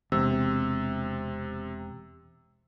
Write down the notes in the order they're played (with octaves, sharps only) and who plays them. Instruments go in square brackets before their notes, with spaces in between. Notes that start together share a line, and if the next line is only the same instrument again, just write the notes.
[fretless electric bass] E1 [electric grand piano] C3 [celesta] E6